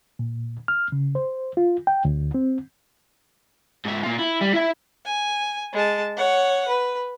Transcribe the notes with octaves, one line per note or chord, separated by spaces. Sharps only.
A#2
F6
C#3
C5
F4
G5
D2
C4
G#2 E5
A#2 F4
E4
G3
E4 E5
G#5
G#3 A5
C#5 F#5
B4